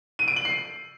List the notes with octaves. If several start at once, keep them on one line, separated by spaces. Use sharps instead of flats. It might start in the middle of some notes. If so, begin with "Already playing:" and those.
D#7
D7
F#7
C7